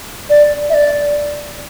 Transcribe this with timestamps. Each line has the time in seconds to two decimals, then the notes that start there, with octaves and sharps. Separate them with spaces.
0.30 D5
0.70 E5
0.74 D5